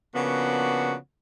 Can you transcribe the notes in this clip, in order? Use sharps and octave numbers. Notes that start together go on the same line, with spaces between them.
C#3 F3 A#3 B3 D4 F#4